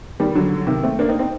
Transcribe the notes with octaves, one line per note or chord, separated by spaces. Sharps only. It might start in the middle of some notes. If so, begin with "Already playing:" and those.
D#3 G3
D3 F#3
C3 D#3
A3 C4
A#3 D4
C4 D#4
C4 D#4